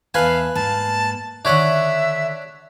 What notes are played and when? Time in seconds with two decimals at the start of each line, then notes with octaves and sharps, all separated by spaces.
0.14 E2 B4 E5 F5 G#5 A5
0.55 G#2 A#3 A5
1.45 D3 D#3 D4 C#5 E5 F#5